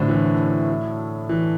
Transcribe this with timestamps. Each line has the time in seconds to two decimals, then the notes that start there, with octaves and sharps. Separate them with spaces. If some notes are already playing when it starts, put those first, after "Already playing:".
Already playing: A2 D3 F#3 A3 C4 D4
0.08 E3
1.29 E3